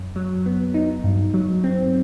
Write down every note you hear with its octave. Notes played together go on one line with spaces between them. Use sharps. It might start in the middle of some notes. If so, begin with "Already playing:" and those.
Already playing: F#2
F#3
B3
D#4
G2
F#3
C4